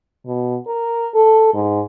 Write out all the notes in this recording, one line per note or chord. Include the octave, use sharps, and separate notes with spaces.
B2
A#4
A4
G#2